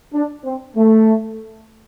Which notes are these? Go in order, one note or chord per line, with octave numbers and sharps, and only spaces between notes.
D4
C4
A3